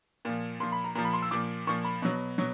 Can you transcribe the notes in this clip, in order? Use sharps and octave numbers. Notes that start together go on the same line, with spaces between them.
A#2 F3
A#2 F3 C6
B5
A#5
A#2 F3 A#5
B5
C6
E6
A#2 F3 D6
A#2 F3 C#6
B5
B2 F#3
B2 F#3